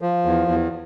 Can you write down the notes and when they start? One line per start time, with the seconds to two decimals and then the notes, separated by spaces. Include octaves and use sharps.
0.01 F3
0.25 E2
0.48 E2